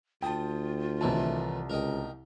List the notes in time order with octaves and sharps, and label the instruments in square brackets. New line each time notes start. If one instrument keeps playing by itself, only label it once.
[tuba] D2 [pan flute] F4 [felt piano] G5 A5 [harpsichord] D#6
[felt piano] C2 A5 [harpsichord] A2 D#3 E3
[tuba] C#2 [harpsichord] A#4 D#5 G5